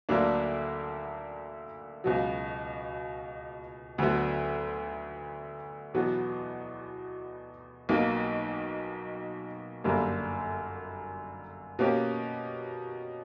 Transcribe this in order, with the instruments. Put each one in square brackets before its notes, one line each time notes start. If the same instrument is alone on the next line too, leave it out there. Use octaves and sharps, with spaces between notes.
[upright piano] D2 D3 F#3 A#3 D4
C#2 B2 F#3
D2 D3 F#3 B3
E2 B2 F#3 B3
B1 B2 A#3
G1 F#2 D3 G3 A#3
B2 A#3 C#4 G4